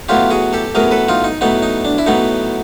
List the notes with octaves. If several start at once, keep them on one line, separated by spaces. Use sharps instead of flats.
A2 F#3 B3 F4 G4
F#4 G#4
G4 A4
A2 F#3 B3 G#4 A#4
A4 B4
D#4 F4
D#4
A2 F#3 B3 D#4
D#4
D4
E4
A2 F#3 B3 D#4